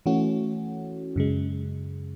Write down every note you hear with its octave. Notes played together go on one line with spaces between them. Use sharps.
E3 A3 C#4 F#4
F#2 C#3 G#3